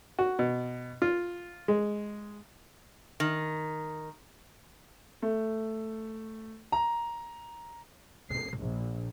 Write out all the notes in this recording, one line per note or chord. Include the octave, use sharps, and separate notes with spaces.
F#4
B2
F4
G#3
D#3
A3
A#5
C7
A#1